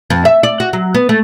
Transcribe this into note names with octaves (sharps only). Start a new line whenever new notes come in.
F2
E5
D5
F#4
F#3
B3
A3